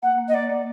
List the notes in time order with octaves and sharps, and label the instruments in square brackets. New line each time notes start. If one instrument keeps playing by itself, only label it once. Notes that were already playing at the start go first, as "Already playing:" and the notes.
[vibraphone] A#3 [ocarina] F#5
[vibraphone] A#3
[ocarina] D#5
[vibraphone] A#3 [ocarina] D5
[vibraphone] A#3